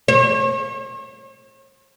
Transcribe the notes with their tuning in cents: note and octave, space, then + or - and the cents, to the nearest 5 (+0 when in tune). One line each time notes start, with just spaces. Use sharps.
C#5 -40